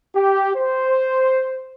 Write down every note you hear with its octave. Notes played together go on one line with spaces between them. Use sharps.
G4
C5